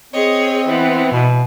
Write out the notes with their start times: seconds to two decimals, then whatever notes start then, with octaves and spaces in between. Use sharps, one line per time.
0.13 C4 G#4 C#5 D#5
0.67 E3 B3
1.12 B2